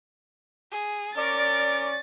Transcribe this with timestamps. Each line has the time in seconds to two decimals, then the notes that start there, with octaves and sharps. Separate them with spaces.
0.72 G#4
1.17 C#4 A#4 D5 A6